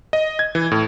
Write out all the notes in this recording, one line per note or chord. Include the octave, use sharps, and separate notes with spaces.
D#5
G#6
E3
A2